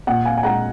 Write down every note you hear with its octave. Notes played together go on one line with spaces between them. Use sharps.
A#2 F#5
F5 G#5
G#5
G#3 F#5 A#5